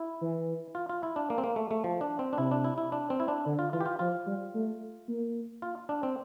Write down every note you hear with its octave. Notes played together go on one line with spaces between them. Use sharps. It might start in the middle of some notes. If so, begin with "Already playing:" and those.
Already playing: E4
E3
F4
F4
E4
D4
A#3
C4
A#3
A3
A3
F3
D4
C4
D4
C3 E4
D4
E4
E4
D4
C4
E4
D4
D3
F4
E3 F4
G4
F4
F3 F4
G3
A3
A#3
F4
D4
C4